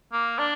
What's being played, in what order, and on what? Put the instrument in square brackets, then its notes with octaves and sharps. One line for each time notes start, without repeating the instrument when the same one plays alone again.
[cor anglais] A#3
D4